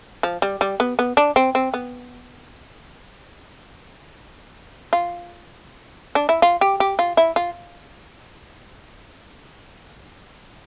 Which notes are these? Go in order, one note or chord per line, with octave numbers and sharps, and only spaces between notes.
F3
G3
G3
B3
B3
D4
C4
C4
B3
F4
D4
E4
F4
G4
G4
F4
E4
F4